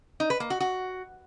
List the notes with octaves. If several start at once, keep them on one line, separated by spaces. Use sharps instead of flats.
D#4
B4
A#3
F#4
F#4